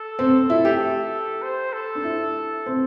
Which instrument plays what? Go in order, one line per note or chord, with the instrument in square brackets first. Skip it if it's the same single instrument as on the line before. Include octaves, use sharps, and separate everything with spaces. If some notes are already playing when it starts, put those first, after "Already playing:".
Already playing: [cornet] A4
[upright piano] C4
E4
G4
[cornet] C5
A4
[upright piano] D4
E4
C4